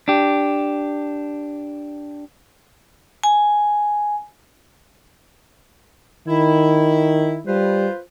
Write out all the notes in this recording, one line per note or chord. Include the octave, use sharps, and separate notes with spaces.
D4 G4
G#5
D#3 E4
G3 F4 B4 C5